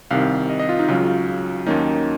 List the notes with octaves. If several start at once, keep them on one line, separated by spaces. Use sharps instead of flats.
C2 C3 D#3 F5
D#5
D#5
F4
D#4
C#2 C#3 F#3 F4
D#2 D#3 F#3 A#3 C#4 D#4